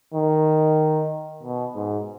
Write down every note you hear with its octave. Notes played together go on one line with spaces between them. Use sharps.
D#3
B2
G#2